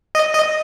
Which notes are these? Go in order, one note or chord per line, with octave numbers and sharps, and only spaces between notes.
D#5
D#5